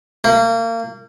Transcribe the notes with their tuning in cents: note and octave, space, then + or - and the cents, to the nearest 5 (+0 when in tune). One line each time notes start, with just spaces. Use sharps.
A#3 -30